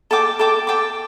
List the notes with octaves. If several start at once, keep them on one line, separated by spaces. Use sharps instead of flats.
A4 G5 D6
A4 G5 D6
A4 G5 D6